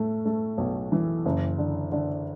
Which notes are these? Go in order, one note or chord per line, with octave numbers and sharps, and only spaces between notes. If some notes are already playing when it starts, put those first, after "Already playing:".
Already playing: A2 A3
A3
B1
E3
F#1
D3
D3